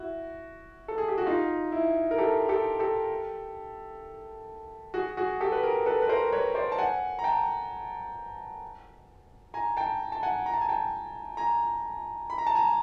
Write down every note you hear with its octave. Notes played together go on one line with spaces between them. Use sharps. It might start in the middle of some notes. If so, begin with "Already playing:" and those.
Already playing: E4 F#4
A4
G#4
G4
F#4
D#4 F4
E4
A#4
G4 A4
G4 A4
G4 A4
F#4 G#4
F#4 G#4
G4 A4
B4
G#4 A#4
A4 B4
B4
A#4 C5
B4 C#5
C5 D5
A5
F#5 G#5
A#5
G5 A5
G#5 A#5
G5 A5
A5
F#5 G#5
A#5
A5
G#5
G5 A5
G#5 A#5
B5
A#5
A5
G#5 A#5